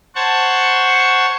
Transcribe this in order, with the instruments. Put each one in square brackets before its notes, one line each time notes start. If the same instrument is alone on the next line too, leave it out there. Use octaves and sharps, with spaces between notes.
[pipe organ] C5 C#5 F#5 A5 C#6